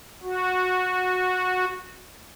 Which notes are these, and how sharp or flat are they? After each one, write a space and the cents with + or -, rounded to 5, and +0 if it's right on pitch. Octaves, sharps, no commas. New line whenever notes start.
F#4 -15